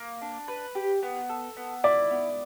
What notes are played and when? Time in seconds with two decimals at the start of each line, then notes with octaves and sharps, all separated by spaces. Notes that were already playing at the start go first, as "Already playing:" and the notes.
Already playing: A#3
0.22 D4
0.48 B4
0.75 G4
1.03 B3
1.29 A4
1.57 B3
1.84 E4 D5
2.10 B3